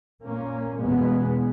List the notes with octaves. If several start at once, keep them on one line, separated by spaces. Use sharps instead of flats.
A#2 A#3 C#4
E2 B2 G#3 B3